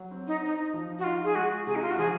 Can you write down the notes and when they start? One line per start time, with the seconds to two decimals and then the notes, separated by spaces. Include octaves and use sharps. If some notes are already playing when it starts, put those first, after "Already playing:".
Already playing: F#3
0.11 C4
0.27 D#4
0.42 D#4 C5
0.74 F3
0.99 F#4
1.04 D#4 F4
1.24 G#4
1.35 G#3 F#4
1.66 C3 G#4
1.76 D#4
1.82 F4
1.91 F#4
1.98 F3 G#4